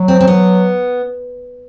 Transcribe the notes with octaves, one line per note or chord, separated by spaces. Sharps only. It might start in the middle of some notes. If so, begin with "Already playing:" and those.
Already playing: F#3
C4
C4
B3